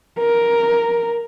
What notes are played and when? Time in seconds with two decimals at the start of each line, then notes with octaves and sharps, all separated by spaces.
0.19 A#4